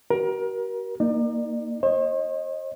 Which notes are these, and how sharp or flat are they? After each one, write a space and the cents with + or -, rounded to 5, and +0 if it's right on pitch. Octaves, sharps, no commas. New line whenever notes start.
F#4 +45 A#4 +30
A#3 +0 D#4 +0 D5 +35
C5 +45 D#5 +0